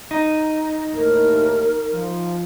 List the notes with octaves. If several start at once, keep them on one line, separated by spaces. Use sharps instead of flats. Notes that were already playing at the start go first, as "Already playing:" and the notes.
D#4
D#2 A2 A#4
F3